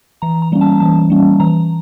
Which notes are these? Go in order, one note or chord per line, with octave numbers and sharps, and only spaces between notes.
E3 A#5
A#5
G3 A#3 C#4
A5
E3 A5
G3 A#3 C#4
E3 A#5